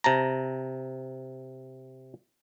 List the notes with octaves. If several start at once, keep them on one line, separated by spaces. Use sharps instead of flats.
C3 A5 A#5